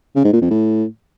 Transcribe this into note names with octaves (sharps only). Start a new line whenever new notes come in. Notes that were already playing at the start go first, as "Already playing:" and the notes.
C#3
G#2
A#2
F2
A2